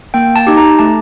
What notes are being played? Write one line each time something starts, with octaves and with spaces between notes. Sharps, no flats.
A#3 G5
A5
D#4 G4
A#5
A3 A5